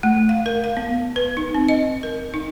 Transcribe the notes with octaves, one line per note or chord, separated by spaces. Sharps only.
A3
F5
A#4
F5
B3
B4
D#4
C4
D#5
A#4
D#4